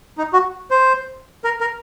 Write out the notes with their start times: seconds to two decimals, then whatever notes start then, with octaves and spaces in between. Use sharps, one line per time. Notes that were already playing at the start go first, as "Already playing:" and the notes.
0.18 D#4
0.33 F#4
0.71 C5
1.44 A#4
1.61 A#4